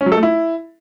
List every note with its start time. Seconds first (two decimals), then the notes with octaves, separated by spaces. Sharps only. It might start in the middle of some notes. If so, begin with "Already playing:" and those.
0.01 C#4
0.06 F#3
0.12 A4
0.17 A3
0.23 E4